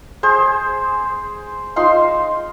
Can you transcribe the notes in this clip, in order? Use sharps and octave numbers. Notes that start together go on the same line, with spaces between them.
G#4 C5
D#4 F4 C5 C6